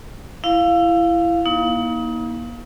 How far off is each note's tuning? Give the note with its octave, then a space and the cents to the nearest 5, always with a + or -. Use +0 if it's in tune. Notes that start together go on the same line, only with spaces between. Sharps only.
E4 +20 F5 +0
A#3 +35 D#4 +35